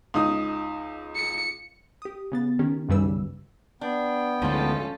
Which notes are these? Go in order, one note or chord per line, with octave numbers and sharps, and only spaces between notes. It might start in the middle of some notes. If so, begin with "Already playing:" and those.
C#2 D#4 D#6
C#7
G4 D#6
C#3 B3 A6
D#3 C#4 G4
B1 F#2 C#3 G3 B4 E6
B3 D4 G5
D2 G#2 F3 C#4 F4 A4